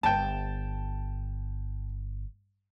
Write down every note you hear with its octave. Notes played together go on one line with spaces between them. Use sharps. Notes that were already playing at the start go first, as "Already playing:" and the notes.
G1 G5 A5